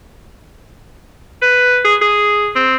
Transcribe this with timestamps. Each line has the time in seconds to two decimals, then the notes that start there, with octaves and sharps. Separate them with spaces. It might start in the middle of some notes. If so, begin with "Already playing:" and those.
1.42 B4
1.85 G#4
2.01 G#4
2.56 C4